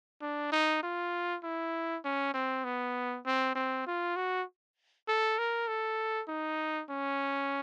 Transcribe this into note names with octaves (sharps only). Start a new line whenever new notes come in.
D4
D#4
F4
E4
C#4
C4
B3
C4
C4
F4
F#4
A4
A#4
A4
D#4
C#4